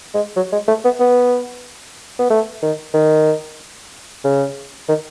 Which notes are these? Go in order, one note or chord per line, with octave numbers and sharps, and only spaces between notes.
G#3
F#3
G#3
A3
B3
B3
B3
A3
D#3
D#3
C#3
D#3